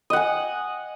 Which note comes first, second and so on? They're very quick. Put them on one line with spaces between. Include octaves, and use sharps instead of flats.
D#5 F#5 G#5